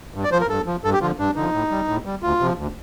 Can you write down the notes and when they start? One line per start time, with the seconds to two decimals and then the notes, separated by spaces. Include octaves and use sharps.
0.14 G2
0.24 D5
0.32 F3 C5
0.41 A#4
0.49 G2 A4
0.66 F3
0.84 G2 A4
0.93 G4
1.01 D3 F3 F4
1.19 G2 D4
1.36 D3 F3 D#4
1.53 A2
1.71 G3
1.88 A2
2.05 G3
2.23 D2 F4
2.40 C3 F3
2.57 D2